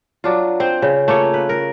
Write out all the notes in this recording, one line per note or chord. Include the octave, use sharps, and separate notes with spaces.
F#3 D4 F4
C4 C5
C#3
A3 A#3 F4 C#5
B4
A#4